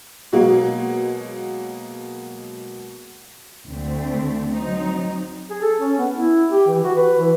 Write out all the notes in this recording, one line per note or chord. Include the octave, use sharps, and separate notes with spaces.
B2 F#3 G#3 A#3
D2 D3 A3 C4
F#3 C4 D#4
G#4
A4
C#4
B3
E4
G4
E3
F#4
B4
E3